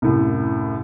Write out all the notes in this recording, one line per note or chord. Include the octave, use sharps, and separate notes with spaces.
C2 F#2 A2